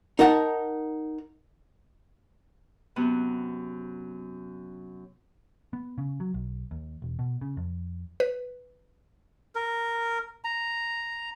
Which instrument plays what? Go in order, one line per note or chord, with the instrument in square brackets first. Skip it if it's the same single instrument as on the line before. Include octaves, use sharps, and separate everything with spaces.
[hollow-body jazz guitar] D#4 A#4 F#5 A5
[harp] F#2 C3 B3
[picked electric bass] B3
C#3
F#3
B1
D#2
E1
B2
C#3
F2
[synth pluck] B4
[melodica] A#4
A#5